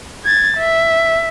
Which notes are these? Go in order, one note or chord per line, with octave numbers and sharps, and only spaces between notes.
G#6 A6
E5